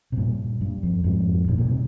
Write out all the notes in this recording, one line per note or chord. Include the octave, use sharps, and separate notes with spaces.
C3
G2 A#2
G2
F2
F2 G#2
G2 A#2
G2 A#2
C3 D#3